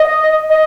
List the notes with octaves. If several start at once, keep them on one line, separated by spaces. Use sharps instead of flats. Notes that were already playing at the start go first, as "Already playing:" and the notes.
Already playing: D#5
D#5